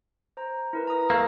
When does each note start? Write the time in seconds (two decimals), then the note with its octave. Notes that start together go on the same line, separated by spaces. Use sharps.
0.37 C5 A#5
0.73 E4 A#4 B4
0.87 A#5 D#6
1.10 A3 A#3 F#6 A#6